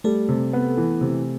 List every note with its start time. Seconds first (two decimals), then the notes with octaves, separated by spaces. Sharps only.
0.04 G3 A3 A4
0.29 C3
0.53 B3
0.78 E3
1.01 C3